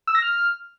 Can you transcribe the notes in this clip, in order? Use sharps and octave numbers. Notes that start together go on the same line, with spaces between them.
E6
A#6
F6